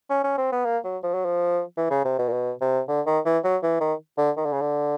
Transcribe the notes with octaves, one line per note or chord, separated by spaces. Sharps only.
C#4
C#4
C4
B3
A#3
F#3
F3
F#3
F3
E3
C#3
C3
B2
A#2
B2
C3
D3
D#3
E3
F#3
E3
D#3
D3
D#3
D3
C#3
D3